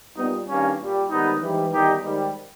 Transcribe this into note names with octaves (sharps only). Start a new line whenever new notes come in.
A#2 G3 B3 D#4
G2 D#3 G3 A#3 C#4
A#2 G3
G#2 D#3 G3 B3 D#4
G#2 E3 G3
E2 D#3 G3 D#4 G4
G#2 D#3 G3